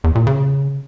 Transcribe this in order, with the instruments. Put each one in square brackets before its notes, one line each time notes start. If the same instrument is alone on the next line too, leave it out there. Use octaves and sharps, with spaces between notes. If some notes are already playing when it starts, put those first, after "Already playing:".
[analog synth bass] E2
A#2
C#3